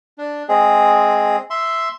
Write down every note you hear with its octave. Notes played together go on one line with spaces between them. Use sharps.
D4
G#3 C4 G#4
E5 C6